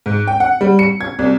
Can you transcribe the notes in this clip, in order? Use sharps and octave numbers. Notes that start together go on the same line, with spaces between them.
G#2
G5
F#5
G3
C#7
G#6
C2